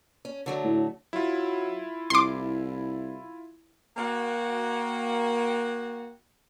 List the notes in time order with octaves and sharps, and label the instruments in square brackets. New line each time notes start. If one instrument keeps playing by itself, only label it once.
[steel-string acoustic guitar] C#4
D3 F#3 A3
[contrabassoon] A2
[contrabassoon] F#3 [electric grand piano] E4 F4
[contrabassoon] C2 [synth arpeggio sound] C6 D6
[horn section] A#3 F#4 G5